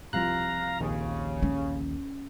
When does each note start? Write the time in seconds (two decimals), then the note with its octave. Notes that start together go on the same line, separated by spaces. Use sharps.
0.13 C2 F3 F4 F5 A#5 F#6
0.80 A#1 D#2 C#3
1.43 C#4